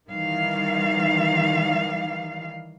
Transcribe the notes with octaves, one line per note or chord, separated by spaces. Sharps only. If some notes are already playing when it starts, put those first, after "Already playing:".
D#3 E3 G3 F5